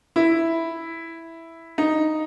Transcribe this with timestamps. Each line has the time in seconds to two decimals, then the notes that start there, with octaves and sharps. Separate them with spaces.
0.16 E4
1.78 D#4